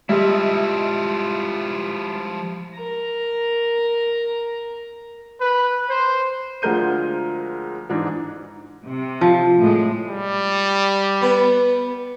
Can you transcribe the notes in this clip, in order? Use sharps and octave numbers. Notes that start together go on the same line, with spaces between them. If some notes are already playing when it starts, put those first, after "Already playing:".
F3 G3 G#3 E4 G4 D#5 E5
A#4 A#5
B4
C5
D2 F3 G#3 A#4 G6 D#7
G#2 E3 D4 D#4
C3
F3
A2 G#3
G3
B3 B4